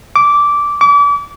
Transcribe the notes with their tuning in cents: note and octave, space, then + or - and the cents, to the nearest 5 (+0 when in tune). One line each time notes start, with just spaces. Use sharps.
D6 -10
D6 -35